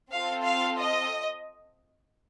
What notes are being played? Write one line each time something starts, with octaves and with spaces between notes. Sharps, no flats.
C4 F4 A4 F5
F5
D#5